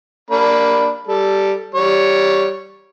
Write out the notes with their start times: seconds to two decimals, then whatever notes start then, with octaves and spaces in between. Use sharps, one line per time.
0.31 A#3 D4 B5
1.08 G3 A4
1.75 G3 C#5